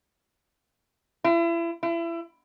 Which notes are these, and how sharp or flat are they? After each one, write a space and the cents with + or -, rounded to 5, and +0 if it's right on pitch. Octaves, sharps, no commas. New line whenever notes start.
E4 +35
E4 +30